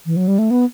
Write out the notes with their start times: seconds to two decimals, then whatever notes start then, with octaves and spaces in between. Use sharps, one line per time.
0.06 E3
0.16 F#3
0.28 G3
0.39 A3
0.51 B3